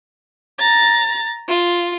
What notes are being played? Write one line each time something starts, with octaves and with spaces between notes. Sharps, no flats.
A#5 A6
F4